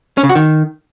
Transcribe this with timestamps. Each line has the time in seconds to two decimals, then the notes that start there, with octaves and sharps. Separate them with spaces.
0.17 C#4
0.23 C#3
0.29 F#4
0.35 D#3